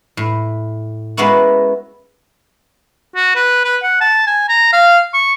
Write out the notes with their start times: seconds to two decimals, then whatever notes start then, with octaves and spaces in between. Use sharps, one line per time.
0.17 A2
1.17 G#3 A#3 B3 C#4 E4 F#4
3.15 F#4
3.35 B4
3.65 B4
3.83 F#5
4.01 A5
4.27 G#5
4.49 A#5
4.73 F5
5.14 C#6